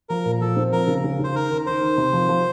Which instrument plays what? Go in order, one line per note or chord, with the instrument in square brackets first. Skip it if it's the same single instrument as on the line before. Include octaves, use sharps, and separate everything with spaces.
[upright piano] F3 [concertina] A#4
[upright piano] A#2
[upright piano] F3 [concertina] A4
[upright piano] C4
[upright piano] F3 [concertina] A#4
[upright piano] C#3
C#3
[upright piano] C#3 [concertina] C5
[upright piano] D#3 [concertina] A#4
[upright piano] D#3
[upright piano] D#3 [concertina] C5
[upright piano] D#3
C3
F3
F3